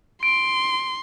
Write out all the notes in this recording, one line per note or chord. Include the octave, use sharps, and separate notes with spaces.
C6 D7